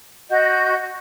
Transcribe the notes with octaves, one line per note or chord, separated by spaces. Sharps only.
F#4 D#5 G6